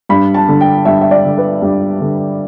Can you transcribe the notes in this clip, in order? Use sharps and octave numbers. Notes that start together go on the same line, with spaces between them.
G2 B5
A5
D3
G5
G2 E5
E5
D5
D3
B4
G2 G4
D3